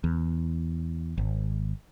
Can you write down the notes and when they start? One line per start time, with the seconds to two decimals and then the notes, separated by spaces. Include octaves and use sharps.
0.04 E2
1.18 G#1